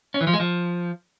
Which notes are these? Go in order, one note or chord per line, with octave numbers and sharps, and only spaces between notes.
C#4
E3
F3
G#3
F3